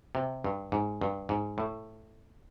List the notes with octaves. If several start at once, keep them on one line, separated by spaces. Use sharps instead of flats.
C3
G2
G#2
G2
G#2
A2